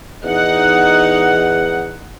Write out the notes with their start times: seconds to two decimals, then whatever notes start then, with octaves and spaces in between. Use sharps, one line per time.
0.24 E2 D#4 F#5